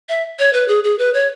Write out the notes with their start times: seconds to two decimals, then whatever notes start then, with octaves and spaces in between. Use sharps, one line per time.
0.09 E5
0.39 C#5
0.53 B4
0.68 G#4
0.84 G#4
0.99 B4
1.14 C#5